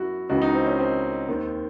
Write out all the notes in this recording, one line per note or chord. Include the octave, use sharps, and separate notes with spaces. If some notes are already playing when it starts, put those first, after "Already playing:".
Already playing: F#2 E4 F#4
C#2 C#3 E3 F#4
D#4
C4
C#4
C4
D#2 D#3